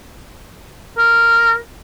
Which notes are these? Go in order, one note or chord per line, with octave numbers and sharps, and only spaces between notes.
A#4